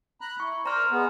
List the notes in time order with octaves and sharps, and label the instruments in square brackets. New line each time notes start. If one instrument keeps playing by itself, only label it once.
[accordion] A#5 B5 F#6
[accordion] E4 [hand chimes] C#6
[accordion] A#4 C5 D5 [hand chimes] A#5 C6 F6
[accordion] G#3 B3